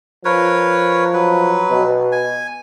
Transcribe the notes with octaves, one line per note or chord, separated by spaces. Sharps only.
F3 A#4 B4 C#5
F#3 B4
B2
G#5